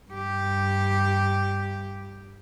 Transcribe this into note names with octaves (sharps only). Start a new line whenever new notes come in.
G2 G4